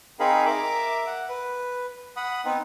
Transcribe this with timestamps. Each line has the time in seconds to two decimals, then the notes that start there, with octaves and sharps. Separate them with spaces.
0.20 C4 D#4 G#4 A#4 F5 B5
0.46 A#4 E5 D6
1.07 F#5
1.29 B4
2.17 F#5 B5 D#6
2.45 B3 C4 D#4 B4